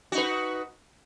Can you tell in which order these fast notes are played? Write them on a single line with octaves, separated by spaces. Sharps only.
F#4 D#4 B4